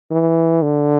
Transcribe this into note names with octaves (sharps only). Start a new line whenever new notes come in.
E3
D3